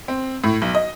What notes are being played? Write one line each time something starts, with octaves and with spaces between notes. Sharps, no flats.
C4
A2
B1
D#5